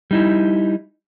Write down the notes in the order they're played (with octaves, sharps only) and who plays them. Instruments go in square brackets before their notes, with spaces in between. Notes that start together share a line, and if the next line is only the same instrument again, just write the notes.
[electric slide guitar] G3 D#4 E4